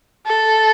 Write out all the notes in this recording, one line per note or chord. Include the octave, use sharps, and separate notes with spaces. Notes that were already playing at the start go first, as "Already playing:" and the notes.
A4